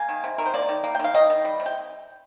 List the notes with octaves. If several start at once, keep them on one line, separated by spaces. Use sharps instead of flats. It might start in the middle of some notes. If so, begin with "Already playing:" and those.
Already playing: A#3 G#5
D#3
C3
D#3 A#4
C5
A#3 D5
D#3
A#3
G5
D#3 F5
D#3 D#5
D#3
G3
C3
G5